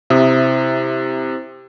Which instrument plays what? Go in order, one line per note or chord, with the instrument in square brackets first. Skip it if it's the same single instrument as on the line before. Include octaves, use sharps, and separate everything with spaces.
[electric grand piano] C3 [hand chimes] E4 C5 D#6 [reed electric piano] E5